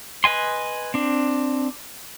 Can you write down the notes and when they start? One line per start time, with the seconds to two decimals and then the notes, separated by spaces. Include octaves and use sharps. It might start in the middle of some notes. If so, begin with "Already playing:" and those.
0.24 B4 D#5 G#5 C6
0.94 C4 D4